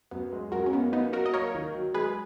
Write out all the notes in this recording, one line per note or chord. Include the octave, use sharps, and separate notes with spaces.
F#2 B3
G#3
F#2 F#4 A#4
C#4
A#3 B3
A#3 B3 D#4
F#3 F#4 A#4
D#5
A#3 A#4 C#5
D#3
F#3
G#3 G#4 B4